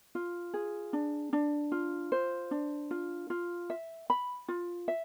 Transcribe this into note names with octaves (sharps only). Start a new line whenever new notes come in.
F4
G#4
D4
D4
F4
C5
D4
F4
F4
E5
B5
F4
E5